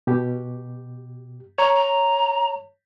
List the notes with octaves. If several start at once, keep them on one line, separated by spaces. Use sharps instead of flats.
B2 G4
C#5 A#5
A#5